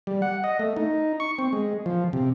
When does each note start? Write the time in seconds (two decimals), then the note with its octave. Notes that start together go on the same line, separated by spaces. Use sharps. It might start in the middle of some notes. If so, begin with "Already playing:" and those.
0.07 G3
0.22 F#5
0.44 D#5
0.59 A3
0.76 D#4
1.20 C#6
1.39 C4
1.53 G#3
1.86 F3
2.13 C3